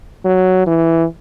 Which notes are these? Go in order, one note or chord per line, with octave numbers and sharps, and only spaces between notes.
F#3
E3